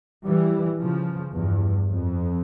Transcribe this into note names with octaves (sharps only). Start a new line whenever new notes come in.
E3 G3
C#3 F3
E2 G2
F2